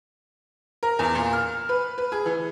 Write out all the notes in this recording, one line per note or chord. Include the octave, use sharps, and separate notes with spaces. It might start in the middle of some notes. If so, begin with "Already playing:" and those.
A#4
E2
A#2
F6
B4
B4
G#4
E3